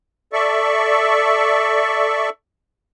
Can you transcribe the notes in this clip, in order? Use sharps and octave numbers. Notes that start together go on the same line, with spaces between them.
A4 D5 E5 C#6